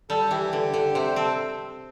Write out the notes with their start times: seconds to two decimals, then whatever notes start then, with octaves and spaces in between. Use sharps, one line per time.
0.10 G3 A4
0.30 E3 G4
0.53 D3
0.74 D3
0.95 C3 C5
1.16 C4 A4